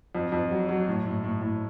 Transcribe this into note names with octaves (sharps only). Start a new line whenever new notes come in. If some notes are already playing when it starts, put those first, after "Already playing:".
F2
F2
F#3
F#3
A2
A2
A2
A2